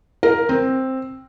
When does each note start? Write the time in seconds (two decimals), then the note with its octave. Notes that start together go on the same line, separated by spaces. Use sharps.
0.23 A#4
0.49 C4